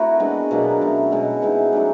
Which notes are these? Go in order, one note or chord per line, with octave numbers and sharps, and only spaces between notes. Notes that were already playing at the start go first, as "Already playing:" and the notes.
Already playing: A3 C4 E4 F#4 A#4
G#3 B3 D4
B2 F#3 A#3 D4
A3 C#4 F#4
B2 G#3 B3
E3 G#3 C4 D#4
F#3 A3 D4